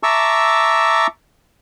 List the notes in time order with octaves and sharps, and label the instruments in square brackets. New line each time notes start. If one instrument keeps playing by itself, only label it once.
[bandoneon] E5 A5 A#5 C#6 D6 E6